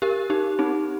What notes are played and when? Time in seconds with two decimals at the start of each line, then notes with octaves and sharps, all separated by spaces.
0.02 G4 A#4
0.30 D#4 G4
0.59 C4 D#4